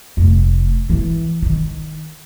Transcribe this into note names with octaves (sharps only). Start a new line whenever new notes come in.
F1
E3
D#3